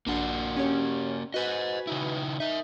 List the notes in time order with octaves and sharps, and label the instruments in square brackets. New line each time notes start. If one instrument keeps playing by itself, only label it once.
[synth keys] A#1 D4 C6 [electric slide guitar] A#3 F#4
[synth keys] C#4 G4 C#5
[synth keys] F#4 B4 G#5 [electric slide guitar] C5 D#5
[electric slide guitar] C#3 D#4 E4
[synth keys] D#4 [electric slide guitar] A#4 E5